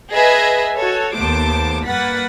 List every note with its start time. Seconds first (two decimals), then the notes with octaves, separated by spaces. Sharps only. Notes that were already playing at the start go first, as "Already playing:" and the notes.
0.12 G#4 B4 D#5 E5 G#5
0.76 F#4 A4 C#5
1.15 D#2 A3 B3 C5 A5 D6
1.85 G2 A#3 B4 F#5 A6 B6